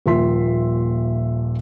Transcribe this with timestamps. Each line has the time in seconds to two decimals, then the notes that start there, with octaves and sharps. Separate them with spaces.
0.06 D#1 A#2 F3 E5 C6 B6